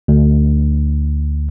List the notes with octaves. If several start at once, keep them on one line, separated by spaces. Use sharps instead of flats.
D2